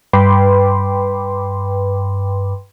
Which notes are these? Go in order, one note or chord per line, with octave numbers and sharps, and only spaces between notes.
G2 B4 G5 B5 C6 D6